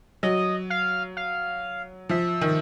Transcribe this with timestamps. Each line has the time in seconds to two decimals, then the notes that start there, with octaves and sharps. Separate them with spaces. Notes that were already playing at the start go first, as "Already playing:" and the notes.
0.23 F#3 D#5
0.70 F5
1.17 F5
2.09 F3 E5
2.41 D#3